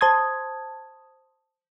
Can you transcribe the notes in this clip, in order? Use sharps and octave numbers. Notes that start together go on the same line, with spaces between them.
C5 A5 C6 D#6 G#6